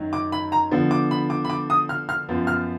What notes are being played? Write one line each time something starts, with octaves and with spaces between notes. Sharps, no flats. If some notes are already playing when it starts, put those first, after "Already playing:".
Already playing: F#2 D#3 F#3
D6
B5
A#5
D3 F3 B3
D6
B5
D6
B5
D6
D#6
F6
F6
F#2 F3 B3 F4
F6